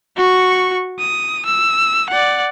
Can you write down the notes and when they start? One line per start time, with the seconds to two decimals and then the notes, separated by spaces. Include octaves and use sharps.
0.17 F#4 C#6
0.99 D#6
1.45 E6
2.10 D5 F#5